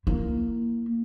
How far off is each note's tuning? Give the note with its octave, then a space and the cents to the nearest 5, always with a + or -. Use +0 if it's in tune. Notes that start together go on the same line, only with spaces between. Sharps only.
A#3 +0 E4 +20